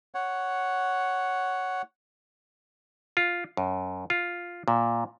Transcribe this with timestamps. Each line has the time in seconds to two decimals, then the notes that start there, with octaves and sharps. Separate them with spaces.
0.14 C#5 F#5
3.17 F4
3.57 F#2
4.10 F4
4.68 A#2